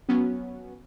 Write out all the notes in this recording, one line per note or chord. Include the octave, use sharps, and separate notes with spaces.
F#3 B3 C#4